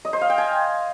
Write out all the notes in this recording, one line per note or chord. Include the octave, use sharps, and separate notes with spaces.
D#5
C5
F5
G5
G#5